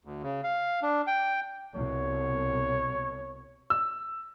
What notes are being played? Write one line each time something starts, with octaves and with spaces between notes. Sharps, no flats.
D2
C#3
F5
D4
G5
C2 B2 C#5
E6